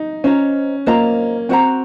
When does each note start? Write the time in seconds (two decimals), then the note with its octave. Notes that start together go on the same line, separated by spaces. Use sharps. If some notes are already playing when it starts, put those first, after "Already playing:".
Already playing: D#4
0.24 C#4 F4 C5 D#5 A#5
0.86 A#3 F4 C5 D#5 A#5
1.49 C4 F#4 C5 F#5 A#5